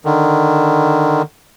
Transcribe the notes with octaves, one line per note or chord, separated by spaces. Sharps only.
D3 D#3